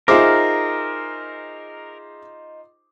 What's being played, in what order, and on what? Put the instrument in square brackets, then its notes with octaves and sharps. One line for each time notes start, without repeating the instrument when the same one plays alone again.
[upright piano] D#4 F4 C5 [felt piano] G#4 E5 D6 [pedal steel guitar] A#4